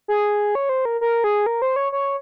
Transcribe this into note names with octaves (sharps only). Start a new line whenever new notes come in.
G#4
C#5
C5
A#4
A#4
G#4
A#4
C5
C#5
C#5